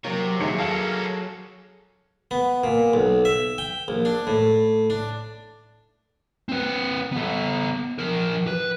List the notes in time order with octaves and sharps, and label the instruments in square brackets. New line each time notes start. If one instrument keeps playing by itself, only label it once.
[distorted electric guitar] C3 [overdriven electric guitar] F#3 C#5 [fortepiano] A#3
[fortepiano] D#2 [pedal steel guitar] F#3 G#4 C#5 [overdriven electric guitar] D#4 E5
[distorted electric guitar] A#3 C#4 [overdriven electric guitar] A4 [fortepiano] F5 A5
[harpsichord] B3
A#2
B1
E5
G5
A#1
D4
A2
D4
[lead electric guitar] C4 B4
B3 A4
F3 A#4
B4